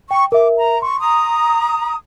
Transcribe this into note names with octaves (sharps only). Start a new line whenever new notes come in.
G5 C#6
A#4 E5 D6
A#5
C6 C#6
A#5 D#6